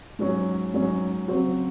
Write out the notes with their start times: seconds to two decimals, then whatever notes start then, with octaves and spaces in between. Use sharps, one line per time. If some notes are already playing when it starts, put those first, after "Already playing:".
0.19 G#2 F#3 C#4
0.74 G#2 F#3 C#4
1.28 C#3 F#3 C4 F#4